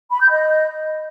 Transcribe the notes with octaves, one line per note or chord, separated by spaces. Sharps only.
B5
G6
D#5